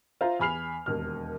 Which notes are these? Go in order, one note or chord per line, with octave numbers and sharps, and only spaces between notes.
F4 C5 E5 F5 A#5
E2 G#5 B5 F6 C7 F7
E1 D#2 F6